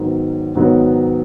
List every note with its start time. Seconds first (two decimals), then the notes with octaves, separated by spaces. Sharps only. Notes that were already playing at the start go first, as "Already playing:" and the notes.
Already playing: G#2 D#3 F#3 B3
0.55 G#2 D#3 F#3 B3